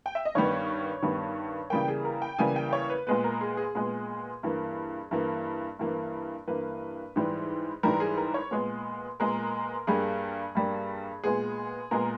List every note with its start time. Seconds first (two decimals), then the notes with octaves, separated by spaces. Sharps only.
0.06 G5
0.15 E5
0.25 D#5
0.35 G2 D#3 G3 B3 C#5
1.02 G2 D#3 G3 B3
1.70 C#3 E3 G3 A#3 G5
1.88 G#4
2.05 A#4
2.22 G5
2.38 C#3 E3 G3 A#3 G#5
2.56 G5
2.73 C#5
2.90 B4
3.07 A#2 G#3 B3 B4
3.24 A#4
3.41 G#4
3.57 G#4
3.75 A#2 G#3 B3 G#4
4.43 G2 E3 A#3
5.11 G2 E3 A#3
5.79 G2 E3 A#3
6.47 G2 E3 A#3 B4
7.16 G#2 E3 G3
7.83 G#2 E3 G3 A#4
8.00 G#4
8.17 A#4
8.34 C#5
8.51 A#2 G#3 B3
9.20 A#2 G#3 B3 A#4
9.87 G2 G3 A#3 G#4
10.55 G2 G3 A#3
11.24 A#2 G#3 B3 G#4
11.91 A#2 G#3 B3 A#4